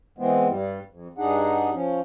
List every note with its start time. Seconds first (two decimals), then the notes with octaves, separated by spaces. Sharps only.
0.18 E3 G#3 B3 C4
0.48 G2 G3
0.90 F2
1.18 G2 D4 D#4 G#4 F#5
1.73 F3 C#4